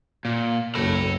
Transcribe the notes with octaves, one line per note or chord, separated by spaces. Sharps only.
A#2
F#1 B1 A4 B5